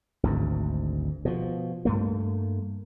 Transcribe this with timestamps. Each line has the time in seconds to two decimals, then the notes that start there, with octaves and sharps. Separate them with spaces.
0.23 G#1 D2 G#2
1.25 B2 F3
1.85 G2 A3 A#3